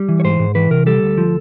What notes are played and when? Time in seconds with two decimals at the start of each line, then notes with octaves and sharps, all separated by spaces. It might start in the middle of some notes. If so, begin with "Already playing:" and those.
Already playing: G3
0.09 E3
0.20 C#5
0.24 G#2 C5
0.39 G#2
0.55 E3 B4
0.71 C3 A#4
0.86 G3 A4
1.03 D2
1.18 F3